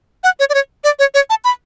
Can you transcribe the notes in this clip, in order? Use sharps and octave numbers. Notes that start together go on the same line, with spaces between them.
F#5
C#5
D5
C#5
D5
C#5
C#5
A5
B5